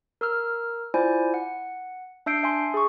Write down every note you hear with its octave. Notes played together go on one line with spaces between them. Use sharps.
A#4 E6 F6
E4 F4 C5 D5 G#5
F#5
D4 E5 E6 G6 C7 D7
E5 G#5 C6
G#4 C#6